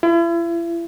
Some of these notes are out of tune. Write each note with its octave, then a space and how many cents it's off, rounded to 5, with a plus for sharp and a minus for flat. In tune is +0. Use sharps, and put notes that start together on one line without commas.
E4 +40